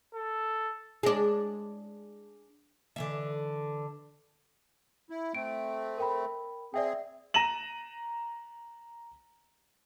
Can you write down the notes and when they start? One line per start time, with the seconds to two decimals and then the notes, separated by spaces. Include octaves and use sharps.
0.14 A4
1.03 G#3 D4
2.96 D3 E3 E5
5.10 E4
5.35 A3 C4 D7
5.98 A#4 G5 B5
6.74 C4 G#4 D5 E5 G5
7.34 A#5 A#6 D#7 E7 F#7